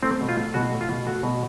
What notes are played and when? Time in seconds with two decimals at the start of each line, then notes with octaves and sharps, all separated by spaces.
0.03 A3 C4
0.21 B2
0.29 F4
0.37 A3
0.54 B2 F#4
0.72 A3
0.81 F4
0.89 B2
1.07 A3 F#4
1.23 B2